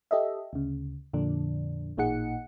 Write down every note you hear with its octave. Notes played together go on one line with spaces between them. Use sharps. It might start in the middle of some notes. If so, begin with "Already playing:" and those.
G4 A4 D#5 E5
D2 C#3
F2 A#2 D3 D4
A1 A#2 D#4 G#4 F#5 C#7